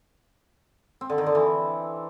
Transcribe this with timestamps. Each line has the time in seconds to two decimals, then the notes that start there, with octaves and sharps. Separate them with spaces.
1.01 C4
1.10 D3
1.18 D#3
1.26 D3
1.35 E3